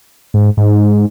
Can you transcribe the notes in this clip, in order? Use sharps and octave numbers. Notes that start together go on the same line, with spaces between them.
G#2
G#2